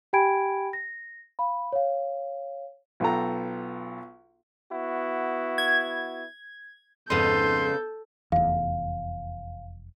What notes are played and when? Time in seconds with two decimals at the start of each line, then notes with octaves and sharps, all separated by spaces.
0.13 G4 G5 G#5 B5 G#6 D7
0.73 A#6
1.39 F5 B5
1.72 C#5 F5
3.00 B1 B3 F4 A4 G5 A#5
4.70 B3 E4 F#4
5.58 G#6
7.10 F2 G#2 C#3 B3 D#4 A4 C6 G6
8.32 F1 E2 F5